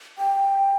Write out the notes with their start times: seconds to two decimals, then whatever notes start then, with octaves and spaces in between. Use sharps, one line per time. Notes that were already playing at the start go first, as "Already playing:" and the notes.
0.18 G5